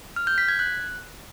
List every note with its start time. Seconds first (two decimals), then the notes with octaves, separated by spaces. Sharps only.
0.16 F6
0.27 G6
0.38 B6
0.48 G#6
0.59 F#6